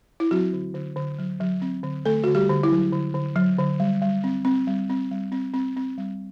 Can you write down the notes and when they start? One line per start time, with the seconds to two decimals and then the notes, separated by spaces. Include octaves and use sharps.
0.20 E4
0.31 F#3 C4 F#4
0.53 D3
0.75 D3
0.96 D3
1.19 F#3
1.41 F#3
1.62 C4
1.83 D3
2.05 D3 A3 A4
2.24 D3 F#4
2.35 G3 G4
2.49 D3
2.63 E4
2.72 F#3
2.92 D3
3.15 D3
3.36 F#3
3.59 D3
3.80 G3
4.02 G3
4.24 C4
4.45 C4
4.67 G3
4.89 C4
5.11 G3
5.32 C4
5.54 C4
5.76 C4
5.98 G3